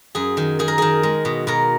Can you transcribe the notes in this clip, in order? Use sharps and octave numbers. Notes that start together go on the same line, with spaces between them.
F#2 G#4
D#3
D#3 G#4
A#4
D#3 G#4
G#3
B2
B2 A#4